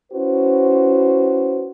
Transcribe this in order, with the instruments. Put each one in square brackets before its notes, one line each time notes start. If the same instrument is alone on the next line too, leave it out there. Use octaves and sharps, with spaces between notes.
[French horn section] C#4 E4 F#4 B4 C5